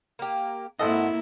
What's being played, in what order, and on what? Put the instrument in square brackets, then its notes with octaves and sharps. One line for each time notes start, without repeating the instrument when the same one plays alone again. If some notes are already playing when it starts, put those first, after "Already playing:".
[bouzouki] A#3 G4
[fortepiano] G#1 A4 D#5 [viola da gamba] A#3 E4 [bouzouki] F#5